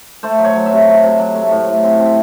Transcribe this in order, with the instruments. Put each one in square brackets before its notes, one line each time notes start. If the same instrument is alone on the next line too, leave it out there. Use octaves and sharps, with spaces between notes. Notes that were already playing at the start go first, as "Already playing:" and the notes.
[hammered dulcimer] A3 C5
F#3
C#5
F#3
E5
C3
F#3
C3
F#3
A3
A2
A2
C4
C4
E5